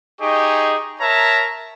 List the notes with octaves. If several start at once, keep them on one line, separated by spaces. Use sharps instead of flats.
D#4 G4 G#4 D#5 C#6
A#4 C#5 E5 A5 A#5